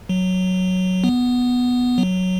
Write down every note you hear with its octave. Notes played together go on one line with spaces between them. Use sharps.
F#3
B3
F#3